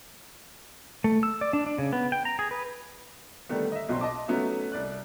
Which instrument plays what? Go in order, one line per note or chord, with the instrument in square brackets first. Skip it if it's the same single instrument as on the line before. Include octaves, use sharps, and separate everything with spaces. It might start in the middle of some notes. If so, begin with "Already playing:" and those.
[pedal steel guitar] A3
E6
D5
D4
D4
C#3
B3
G5
A#5
G#4
B4
[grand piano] D3 D#3 G3 A3 B3
D#5 E5
B1 B2 F#3 C4 D4 C6
D#5 A5 D6
F#3 A3 B3 C#4 D#4 E5
C2 D5 F#6